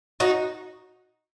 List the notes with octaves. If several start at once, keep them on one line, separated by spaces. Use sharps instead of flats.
D#4 F#4